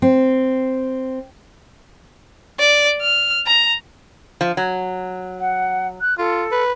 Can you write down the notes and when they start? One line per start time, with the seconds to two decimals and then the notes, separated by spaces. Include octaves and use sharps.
0.02 C4
2.59 D5
3.01 F6
3.47 A#5
4.41 F3
4.57 F#3
5.40 F#5
6.01 F#6
6.18 F4 A4
6.52 B4